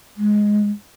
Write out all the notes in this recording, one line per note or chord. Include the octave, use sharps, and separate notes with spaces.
G#3